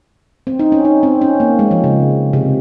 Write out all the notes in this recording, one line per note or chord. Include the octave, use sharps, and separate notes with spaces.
C4
D#4
C#4
D#4
C4
C#4
A#3
G#3
F3
C#3
C3